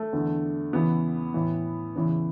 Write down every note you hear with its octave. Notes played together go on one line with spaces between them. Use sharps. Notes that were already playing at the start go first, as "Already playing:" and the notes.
Already playing: A3
E2 D3
E2 C#3 E3 B3
A2 E3
E2 C#3 E3